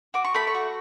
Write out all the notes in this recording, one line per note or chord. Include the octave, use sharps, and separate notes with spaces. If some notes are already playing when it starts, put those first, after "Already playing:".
F#4 D6
C#6
A3 B5
C#6
F#4